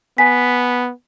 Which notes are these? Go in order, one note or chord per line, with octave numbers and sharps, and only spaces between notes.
B3 G#5 B6